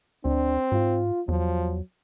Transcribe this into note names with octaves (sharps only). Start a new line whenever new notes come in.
D2 C4 D4
G#2 F4
E2 F3 F#3